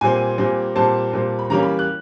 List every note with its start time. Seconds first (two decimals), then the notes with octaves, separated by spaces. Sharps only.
0.01 A#2 G3 C4 G#5
0.38 A#2 G3 C4
0.76 A#2 G3 C4 A5
1.13 A#2 G3 C4
1.39 B5
1.50 E3 G3 A#3 C#4 A#5
1.63 B5
1.79 F#6